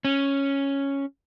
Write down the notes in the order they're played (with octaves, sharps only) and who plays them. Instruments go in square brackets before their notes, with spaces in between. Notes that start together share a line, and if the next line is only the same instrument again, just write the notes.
[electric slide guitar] C#4